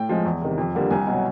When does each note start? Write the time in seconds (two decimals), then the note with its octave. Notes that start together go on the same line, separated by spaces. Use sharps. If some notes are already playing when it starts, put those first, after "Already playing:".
Already playing: A2 G5
0.09 F3 G#3
0.25 E2
0.42 C3 D#3
0.58 F2
0.75 D3 G3 A#3
0.91 C2 G#5
1.07 B2 F#3